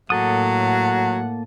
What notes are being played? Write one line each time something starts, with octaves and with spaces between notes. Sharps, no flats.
A2 F#3 A#3 A4 F#5 D#6